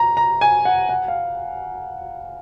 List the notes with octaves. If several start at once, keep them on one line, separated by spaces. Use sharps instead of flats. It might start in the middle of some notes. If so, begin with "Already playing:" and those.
Already playing: A#5
A#5
G#5
F#5
F#5
F5